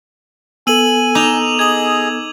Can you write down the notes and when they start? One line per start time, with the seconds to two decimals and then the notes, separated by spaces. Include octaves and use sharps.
0.67 B3 A4 G#5 E6 D#7 F#7
1.15 D#4 D6 F7
1.59 G#4 D#5 G#6 F#7